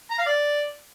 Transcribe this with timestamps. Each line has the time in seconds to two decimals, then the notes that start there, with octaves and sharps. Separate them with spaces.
0.11 A#5
0.18 F5
0.26 D5